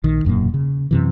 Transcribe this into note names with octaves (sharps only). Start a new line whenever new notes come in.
A#1 D#3
E1 F#2 A#2 A#3
C#3
F#2 C3 E3